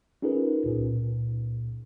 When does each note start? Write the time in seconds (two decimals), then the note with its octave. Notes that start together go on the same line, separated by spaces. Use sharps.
0.22 C#4 D#4 F4 G#4 A#4 B4
0.66 C#2 A#2